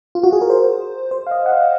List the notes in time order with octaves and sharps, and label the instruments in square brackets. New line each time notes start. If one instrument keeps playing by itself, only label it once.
[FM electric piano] F4
F#4
G#4
A#4
C5
C5
F5
D#5
F#5
F5